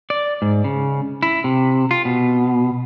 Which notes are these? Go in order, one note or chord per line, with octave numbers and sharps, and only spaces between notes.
D5
G#2
C#3
E4
C3
F4
B2